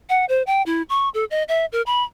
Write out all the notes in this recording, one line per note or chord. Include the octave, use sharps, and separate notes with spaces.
F#5
C5
G5
E4
C#6
A4
D#5
E5
A#4
B5